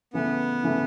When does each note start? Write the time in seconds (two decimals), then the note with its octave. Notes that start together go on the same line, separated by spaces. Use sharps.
0.13 C#3 E3 A3 B3
0.63 C#3 E3 A3